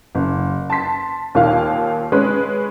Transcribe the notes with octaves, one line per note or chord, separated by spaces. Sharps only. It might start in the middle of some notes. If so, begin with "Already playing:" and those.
F#1
A5 C6 B6
D#2 A#2 F5
G#3 C#4 B4